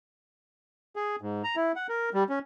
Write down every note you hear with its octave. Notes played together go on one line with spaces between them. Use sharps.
G#4
G#2
A#5
E4
F#5
A#4
G3
C#4